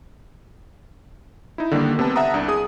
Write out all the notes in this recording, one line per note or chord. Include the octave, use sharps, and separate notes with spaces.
D#4 E4
D3 D#3 G3 A#3 D4
C3 B3 A5
E5 F#5 A5 A#5 D#6
C2 D4
G#4 D#6